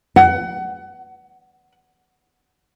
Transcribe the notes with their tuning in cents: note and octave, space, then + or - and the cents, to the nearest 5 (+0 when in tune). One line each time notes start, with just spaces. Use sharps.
F#5 +25